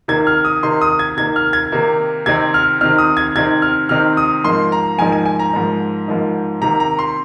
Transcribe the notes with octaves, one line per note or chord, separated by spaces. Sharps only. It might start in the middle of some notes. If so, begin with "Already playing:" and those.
C3 D#3 A#3 D#4 G#6
F6
D#6
C3 D#3 A#3 D#4 C6
D#6
G#6
C3 D#3 A#3 D#4 G#6
F6
G#6
C3 D#3 A#3 D#4
C3 D#3 C4 D#4 G#6
F6
C3 D#3 C4 D#4 F6
D#6
G#6
C3 D#3 C4 D#4 G#6
F6
C3 D#3 C4 D#4 F6
D#6
G#2 F3 A#3 D#4 C6
A#5
G#2 F3 A#3 D#4 G#5
G#5
G#5
A#5
G#2 F3 A#3 D#4
G#2 F3 A#3 D#4
C3 D#3 A#3 A#5
A#5
C6